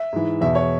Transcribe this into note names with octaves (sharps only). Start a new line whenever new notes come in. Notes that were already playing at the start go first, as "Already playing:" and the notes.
Already playing: E5
G#2 E3
E2 B2 E5
C#5